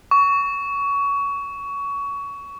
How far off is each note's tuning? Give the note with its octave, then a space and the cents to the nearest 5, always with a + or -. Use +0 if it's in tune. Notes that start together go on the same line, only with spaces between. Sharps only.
C#6 +20